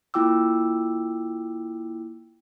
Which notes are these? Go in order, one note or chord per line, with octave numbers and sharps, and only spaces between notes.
A#3 E4 F4 G5 D6 E6